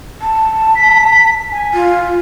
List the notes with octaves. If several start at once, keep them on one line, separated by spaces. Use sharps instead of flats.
A5
B6
G#5
F4